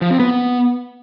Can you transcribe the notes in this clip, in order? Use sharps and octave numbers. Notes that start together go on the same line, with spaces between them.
F3
C4
B3